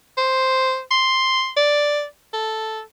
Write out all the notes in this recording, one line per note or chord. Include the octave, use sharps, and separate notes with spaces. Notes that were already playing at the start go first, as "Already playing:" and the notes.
C5
C6
D5
A4